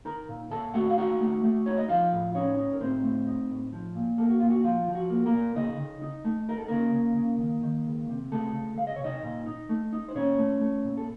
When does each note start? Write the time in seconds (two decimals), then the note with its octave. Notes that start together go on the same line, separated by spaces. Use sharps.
0.05 D#4 A#4 A#5
0.29 A#2
0.51 A#2 A4 A5
0.74 A3 F#4 F#5
0.90 F5
0.97 D#4 F#4 F#5
1.21 A3
1.44 A3
1.66 D#4 C#5
1.77 D#5
1.88 F3 F4 F5
2.12 A2
2.35 C#4 D#4 C#5
2.58 D#4
2.73 A#4
2.81 A2 C4 C5
3.04 A3
3.27 D#4
3.50 A2
3.72 F3
3.95 A#2
4.18 A#3 A4
4.29 F#4
4.40 A#2 F4
4.50 F#4
4.64 F3 F4
4.88 F3
4.95 F#4
5.10 A#3
5.26 A#3 A#4
5.33 A#2
5.56 C#3 D#4 D#5
5.80 C#3
6.02 D#4
6.25 A3
6.49 D#4 A#4
6.58 A4
6.68 C#3 A#3 A#4
6.94 C#3
7.17 C#3
7.40 D#3
7.63 D#3
7.86 C#2
8.09 C3
8.32 C#2 A3 A4
8.54 C#2
8.78 C#2 F5
8.87 D#5
8.96 C#5
9.00 C3 D#4 D#5
9.23 A#2
9.46 D#4
9.69 A3
9.93 D#4
10.08 C5
10.15 A#2 C#4 C#5
10.38 A3
10.61 A3
10.84 A#2
10.97 A4